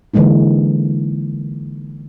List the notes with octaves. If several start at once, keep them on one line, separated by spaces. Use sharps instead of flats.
D3 E3 G#3 A#3 D#4